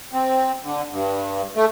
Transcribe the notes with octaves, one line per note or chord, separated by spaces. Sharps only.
C4
D3
G2
A3